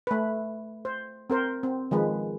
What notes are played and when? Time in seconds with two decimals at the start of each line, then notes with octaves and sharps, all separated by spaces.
0.07 A3 B4
0.85 C5
1.30 C4 A#4 C5
1.63 C4
1.91 D#3 F3 G#3 B4